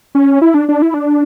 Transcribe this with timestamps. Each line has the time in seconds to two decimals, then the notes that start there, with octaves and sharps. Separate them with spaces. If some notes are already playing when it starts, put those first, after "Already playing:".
0.15 C#4
0.42 E4
0.54 D4
0.69 D4
0.82 E4
0.94 D4